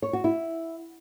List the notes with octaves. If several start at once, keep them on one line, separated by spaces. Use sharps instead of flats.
C#5
F#4
E4